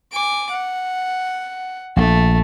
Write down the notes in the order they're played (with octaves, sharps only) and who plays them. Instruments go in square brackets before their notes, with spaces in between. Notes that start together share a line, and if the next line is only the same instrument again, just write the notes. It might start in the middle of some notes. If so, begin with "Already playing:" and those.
[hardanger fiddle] G#5 D6
F#5
[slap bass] A#1 [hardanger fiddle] A3